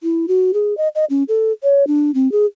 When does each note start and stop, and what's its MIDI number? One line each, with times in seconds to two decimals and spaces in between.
0.03 0.26 64
0.28 0.52 66
0.54 0.76 68
0.77 0.88 75
0.95 1.05 75
1.10 1.23 61
1.28 1.52 69
1.63 1.87 73
1.87 2.11 62
2.15 2.31 60
2.32 2.46 68